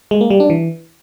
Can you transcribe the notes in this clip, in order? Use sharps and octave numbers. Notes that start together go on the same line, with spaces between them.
G#3
A#3
G3
D4
E3